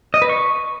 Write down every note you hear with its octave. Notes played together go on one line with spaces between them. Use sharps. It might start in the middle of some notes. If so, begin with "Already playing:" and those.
D#5
B4
C#6